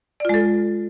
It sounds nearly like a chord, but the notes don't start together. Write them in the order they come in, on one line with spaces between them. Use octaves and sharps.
D5 F4 G#3 A4